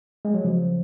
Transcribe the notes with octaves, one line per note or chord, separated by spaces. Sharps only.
G#3
F#3
C#3 F3